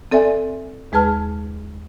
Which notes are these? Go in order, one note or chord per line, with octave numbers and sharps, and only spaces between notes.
C4 A4 D5 E5 G#5
D#2 G#3 G#4 B4 A5 F6